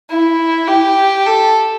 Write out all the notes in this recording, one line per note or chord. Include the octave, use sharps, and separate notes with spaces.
E4
G4
A4